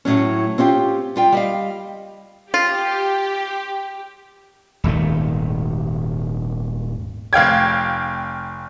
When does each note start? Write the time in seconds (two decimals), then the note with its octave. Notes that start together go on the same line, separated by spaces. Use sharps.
0.05 A2 F#3 C#4
0.58 C4 C#4 F4 G4
1.16 G3 F4 G5
1.33 G3 D#5 F5
2.54 F4 G4
4.84 D#1 G#1 D#3 A3
7.33 F1 F5 G5 G#6